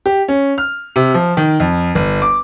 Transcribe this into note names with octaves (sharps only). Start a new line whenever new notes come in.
G4
C#4
F6
C3
F3
D#3
F2
G1
D6